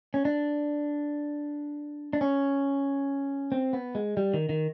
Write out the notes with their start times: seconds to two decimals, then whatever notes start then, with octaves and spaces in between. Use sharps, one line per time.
0.14 C#4
0.25 D4
2.13 D4
2.21 C#4
3.52 C4
3.73 B3
3.95 G#3
4.17 G3
4.34 D#3
4.49 D#3